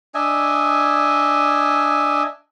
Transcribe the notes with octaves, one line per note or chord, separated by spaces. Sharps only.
D4 D#5 E5 G#5